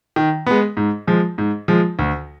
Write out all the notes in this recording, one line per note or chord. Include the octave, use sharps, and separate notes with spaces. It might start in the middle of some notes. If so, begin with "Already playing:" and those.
D#3
G#3 B3
G#2
F3 G#3
G#2
F3 G#3
D2